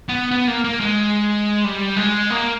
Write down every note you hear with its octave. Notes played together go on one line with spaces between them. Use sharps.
B3
B3
A#3
A#3
G#3
G3
G#3
A#3